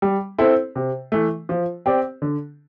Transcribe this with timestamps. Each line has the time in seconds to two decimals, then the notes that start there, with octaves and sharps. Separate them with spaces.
0.02 G3
0.38 C4 E4 A4 C5
0.76 C3
1.12 E3 A3
1.49 F3
1.86 C4 G4 D5
2.22 D3